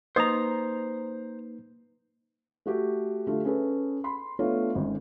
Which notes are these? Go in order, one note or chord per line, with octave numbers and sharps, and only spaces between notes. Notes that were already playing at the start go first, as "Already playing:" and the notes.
A#3 D#4 B4 C5 D#5 A#5 D#6
A3 F#4 G4 A4
D3 A3 F4 G4
C#4 G#4 A4 B4
B5 C6
A3 B3 D4 F4 A4 C#5
G#1 C#4